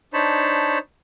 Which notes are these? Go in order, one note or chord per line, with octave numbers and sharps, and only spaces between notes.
D4 D#4 C5 C#5 A5 B5